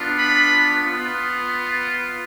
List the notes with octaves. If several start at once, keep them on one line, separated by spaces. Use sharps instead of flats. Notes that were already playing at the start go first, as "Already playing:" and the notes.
Already playing: B3 D4 F4
B5
B3 F4